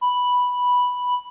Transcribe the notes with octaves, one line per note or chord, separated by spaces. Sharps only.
B5